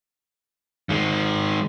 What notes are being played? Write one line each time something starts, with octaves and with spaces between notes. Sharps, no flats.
D#3 G#3